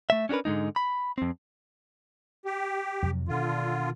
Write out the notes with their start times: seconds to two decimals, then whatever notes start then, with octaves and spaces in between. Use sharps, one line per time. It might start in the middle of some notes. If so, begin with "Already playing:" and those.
0.10 A3 E5
0.29 C#4 D4 F#4 A#4 B4
0.45 G#2 D3 G#3 D#4
0.76 B5
1.18 F2 C4
2.45 G4
3.02 F2 C3 F#3
3.28 B2 D3 D#3 F4